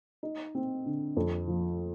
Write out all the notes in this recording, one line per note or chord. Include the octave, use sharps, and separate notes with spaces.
D#4
C4
D3
F2
F3